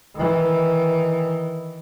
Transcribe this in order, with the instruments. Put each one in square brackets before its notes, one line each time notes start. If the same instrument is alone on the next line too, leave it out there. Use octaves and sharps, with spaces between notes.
[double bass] D#3 E3